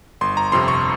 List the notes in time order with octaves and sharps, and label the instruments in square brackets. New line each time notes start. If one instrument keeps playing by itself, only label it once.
[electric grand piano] G1 C6
A#5
F2 C3 C6
C#6